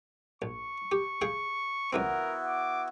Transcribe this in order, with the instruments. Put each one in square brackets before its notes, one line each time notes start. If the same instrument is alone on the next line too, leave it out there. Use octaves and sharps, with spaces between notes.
[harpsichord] A#1 [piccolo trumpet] C#6
[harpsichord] G4
G#4 F5 G5
[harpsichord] C#2 E3 C4 [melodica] B3 E4 F#4 [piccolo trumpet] A#4
[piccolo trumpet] D6